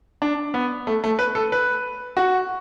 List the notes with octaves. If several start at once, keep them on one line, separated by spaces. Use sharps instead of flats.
D4
B3
A3
A3
B4
A4
B4
F#4